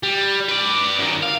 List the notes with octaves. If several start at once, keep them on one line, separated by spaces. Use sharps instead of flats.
G3
B4 D5
F#2 D#3
F5